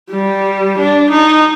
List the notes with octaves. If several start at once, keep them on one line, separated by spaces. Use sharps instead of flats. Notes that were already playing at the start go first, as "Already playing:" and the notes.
G3
D4
D#4